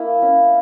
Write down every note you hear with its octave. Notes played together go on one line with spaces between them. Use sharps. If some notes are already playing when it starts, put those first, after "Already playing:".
Already playing: A#3 E4
C#4